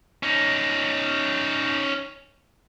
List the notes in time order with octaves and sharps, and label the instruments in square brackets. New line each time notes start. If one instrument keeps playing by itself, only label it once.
[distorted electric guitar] C#4 D#4